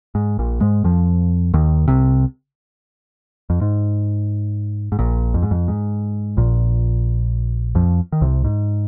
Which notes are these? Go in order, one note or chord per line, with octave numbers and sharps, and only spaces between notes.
G#2
A#1 A#2
G#2 G#3
F2 F3
D#2 D#3
C2 C3
F2
G#2
G#2
A#1 A#2
F2
G#2
F2
G#2
A#1 A#2
F2 F3
D#3
C2 C3
G#2